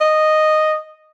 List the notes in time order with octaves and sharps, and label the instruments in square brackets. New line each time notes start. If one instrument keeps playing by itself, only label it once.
[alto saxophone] D#5